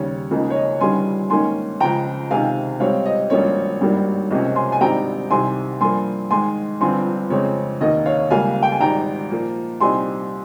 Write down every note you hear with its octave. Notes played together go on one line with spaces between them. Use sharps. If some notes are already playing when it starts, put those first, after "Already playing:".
Already playing: D#2 C#3 G3 C#4 C#5
C#2 C#3 F3 A#3 D#4
C#5
D#5
G1 G2 D#3 G3 C#4 G#5 C6
G#2 D#3 A#3 C#4 G#5 C6
C#2 C#3 F3 G5 A#5
C#2 C3 D#3 F5 G#5
G#2 G3 C4 D#4 C#5 F5
D#5
G#1 G2 F3 A#3 C#4 C#5
G#1 G2 D#3 G3 A#3
C#2 C3 F3 A#3 C#4 D#5
G#5 C6
G#5
G#1 G2 G3 C4 D#4 G5 A#5
C2 C3 D#3 G3 G#5 C6
G2 F3 A#3 G#5 C6
G#2 D#3 G#3 G#5 C6
G1 G2 F3 C4 G#5 C6
F2 C#3 G#3 C4 C#5
F1 D#2 D#3 A#3 D#5
C#5 F5
C#2 C#3 G3 A#3 F5 G#5
F5
G5
G#5
G#1 G#2 G3 G5 A#5
A#2 F3 A#3
C2 A#2 G3 C4 D#4 G#5 C6